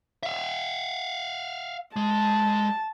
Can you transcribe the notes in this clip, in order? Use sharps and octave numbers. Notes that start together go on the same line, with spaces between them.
E5 F5
G#3 A5